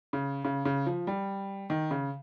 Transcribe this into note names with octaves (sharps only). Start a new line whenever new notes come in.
C#3
C#3
C#3
F3
G3
D#3
C#3